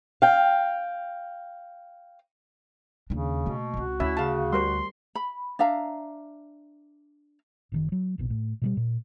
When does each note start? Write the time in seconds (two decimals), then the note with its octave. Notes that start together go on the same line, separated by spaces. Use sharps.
0.22 F5 G5
3.10 D#2 C#3 D4
3.46 B2 A3 A#3
3.74 C#2 C4 F#4
4.00 D2 C#4 E4 E5
4.17 C#3 F5 A5
4.53 G3 A#4 C5 C6
5.15 B5
5.59 D4 E5 F5 A#5
7.72 F#1 C3 D#3
7.92 F#3
8.18 D#1 A#1 B2
8.30 A2
8.62 B2 F#3 G3
8.77 A#2